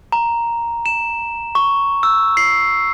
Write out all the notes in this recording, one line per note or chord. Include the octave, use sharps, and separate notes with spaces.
A#5
E7
C#6
E6
C7